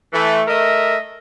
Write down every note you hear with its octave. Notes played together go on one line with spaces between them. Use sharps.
E3 A3
A3 A#4 D#5 E5